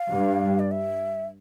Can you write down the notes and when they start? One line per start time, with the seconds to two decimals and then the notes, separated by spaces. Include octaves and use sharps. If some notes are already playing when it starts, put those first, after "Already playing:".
Already playing: F5
0.10 G2
0.59 D5
0.71 E5